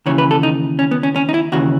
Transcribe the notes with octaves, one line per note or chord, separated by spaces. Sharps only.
D#2 C#3 E3 C#5
B4
A4
D#4
C#4
B3
C#4
C#4
D#4
E4
D#2 C#3 E3 F#4